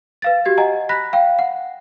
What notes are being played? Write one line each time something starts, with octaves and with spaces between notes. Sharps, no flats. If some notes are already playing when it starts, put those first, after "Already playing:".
B4 F5 A6
F#4 G4 G#6
D#5 F#5 G#5 A#5
B5 F#6 A#6 B6
F5 G5
F#5